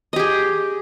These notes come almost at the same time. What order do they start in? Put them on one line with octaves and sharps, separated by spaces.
D#5 G4 G#4